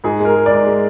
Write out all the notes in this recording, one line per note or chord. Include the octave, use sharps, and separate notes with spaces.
G#2 G#4
G#3
A#4
G#3
D5
G#2
G#3